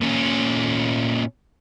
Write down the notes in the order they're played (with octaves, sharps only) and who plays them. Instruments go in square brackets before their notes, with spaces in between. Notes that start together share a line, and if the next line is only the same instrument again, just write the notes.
[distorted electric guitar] A#2 C#4